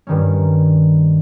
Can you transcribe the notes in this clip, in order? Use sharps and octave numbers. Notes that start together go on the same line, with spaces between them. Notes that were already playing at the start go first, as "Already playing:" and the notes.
G2 D#3 C#4